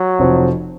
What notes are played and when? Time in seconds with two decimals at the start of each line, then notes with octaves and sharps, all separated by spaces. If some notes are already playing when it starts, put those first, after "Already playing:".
Already playing: F#3
0.18 F1 F2 F3